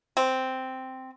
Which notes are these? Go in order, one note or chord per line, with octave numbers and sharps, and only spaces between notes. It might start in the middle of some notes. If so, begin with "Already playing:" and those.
C4